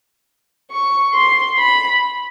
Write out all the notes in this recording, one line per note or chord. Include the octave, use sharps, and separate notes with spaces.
C#6
C6
B5